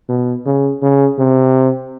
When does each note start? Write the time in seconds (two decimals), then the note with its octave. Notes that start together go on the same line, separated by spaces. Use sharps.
0.09 B2
0.46 C#3
0.82 C#3
1.18 C3